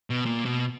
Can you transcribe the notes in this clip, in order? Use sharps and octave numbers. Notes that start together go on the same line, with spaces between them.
B2
A#2
B2